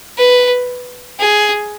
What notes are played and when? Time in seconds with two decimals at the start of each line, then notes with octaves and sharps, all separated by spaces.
0.18 B4
1.20 G#4